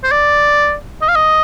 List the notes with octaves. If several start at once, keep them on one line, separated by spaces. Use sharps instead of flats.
C5
D5
D#5
F5
D#5